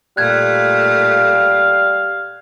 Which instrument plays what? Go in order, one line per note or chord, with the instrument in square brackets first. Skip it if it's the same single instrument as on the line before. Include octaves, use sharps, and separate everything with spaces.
[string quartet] A#2 A3 [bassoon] G3 [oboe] F5 [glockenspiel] F#6 G#6